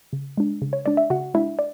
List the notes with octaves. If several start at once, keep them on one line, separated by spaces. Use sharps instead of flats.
C#3
G#3 D4
C#3
C#5
G#3 D4 D5
E5
C#3 F#4 F#5
G#3 D4 E4 E5
D5